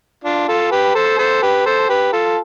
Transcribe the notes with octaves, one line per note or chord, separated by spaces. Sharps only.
D4 F4
F4 A4
G4 B4
A4 C5
A4 C5
G4 B4
A4 C5
G4 B4
F4 A4